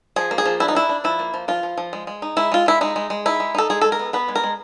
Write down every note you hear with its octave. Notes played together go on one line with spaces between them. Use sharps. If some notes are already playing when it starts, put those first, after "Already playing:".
F3 G#4
A#3
G#4
F3
D4 E4
D#4
D4 E4
D4
F3 E4
A#3
F3
F3 F4
F3
F3
G#3
G#3
D#4
G#3 E4
G#3 F4
G#3 E4
G#3 D#4
G#3
G#3
D#4 E4
G#3
D#4 A4
G#3 G#4
G#3 A4
A#4
B3
B3 B4
G#3
A#4
G#3